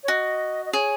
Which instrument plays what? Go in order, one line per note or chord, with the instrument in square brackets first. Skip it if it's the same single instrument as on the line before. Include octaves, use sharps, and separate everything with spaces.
[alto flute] C#5
[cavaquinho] F#4 [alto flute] D#5
[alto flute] D#5
[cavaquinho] G#4 [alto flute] C#5